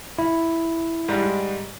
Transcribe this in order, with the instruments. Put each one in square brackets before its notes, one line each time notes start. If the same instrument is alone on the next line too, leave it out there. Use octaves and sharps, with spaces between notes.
[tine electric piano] E4
[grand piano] G#2 G3 G#3